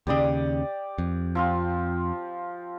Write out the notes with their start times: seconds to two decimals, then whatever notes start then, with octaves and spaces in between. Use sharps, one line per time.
0.07 D#2 C#3 G4 D5 D#6
0.98 F2
1.35 F3 C4 F4